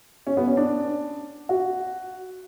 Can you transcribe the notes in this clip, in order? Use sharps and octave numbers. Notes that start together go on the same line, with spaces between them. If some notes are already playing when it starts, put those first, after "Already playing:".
C#4
B3
C#4
D4
F#4